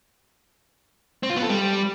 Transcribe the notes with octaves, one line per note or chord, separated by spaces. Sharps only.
C4
F4
B3
A4
G3